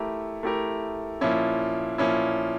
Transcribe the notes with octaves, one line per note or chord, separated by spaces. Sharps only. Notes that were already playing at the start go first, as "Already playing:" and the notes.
Already playing: A3 E4 G4 A#4
A3 E4 G4 A#4
A#2 F3 C#4 E4
A#2 F3 C#4 E4